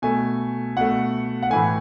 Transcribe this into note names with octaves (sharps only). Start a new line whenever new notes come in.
B2 A3 G#5
B2 A3 F#5
F#5
A2 E3 A3 G#5